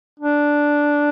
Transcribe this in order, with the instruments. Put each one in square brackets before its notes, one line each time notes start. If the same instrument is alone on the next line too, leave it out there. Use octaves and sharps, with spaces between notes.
[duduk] D4